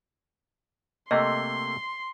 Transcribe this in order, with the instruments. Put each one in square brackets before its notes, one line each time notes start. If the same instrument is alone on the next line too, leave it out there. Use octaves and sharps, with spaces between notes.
[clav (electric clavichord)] C3 A3 A#3 [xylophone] D#5 [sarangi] C6